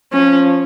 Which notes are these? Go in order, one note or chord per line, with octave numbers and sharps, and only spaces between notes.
F3 C#4